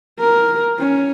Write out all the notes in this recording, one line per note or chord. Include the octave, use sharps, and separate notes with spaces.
A#4
C#4